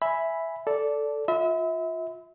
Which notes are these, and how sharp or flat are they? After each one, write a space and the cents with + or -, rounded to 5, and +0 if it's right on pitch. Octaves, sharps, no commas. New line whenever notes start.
E5 +0 G#5 +0 B5 +0
A4 +0 D5 -15
F4 +25 E5 -35 B5 +35